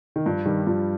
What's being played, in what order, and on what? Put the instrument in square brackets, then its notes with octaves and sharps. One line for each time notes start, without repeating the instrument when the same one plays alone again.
[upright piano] D#3
[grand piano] G2 [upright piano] F3
[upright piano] D#3 [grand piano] G3
[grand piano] G2 [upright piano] F3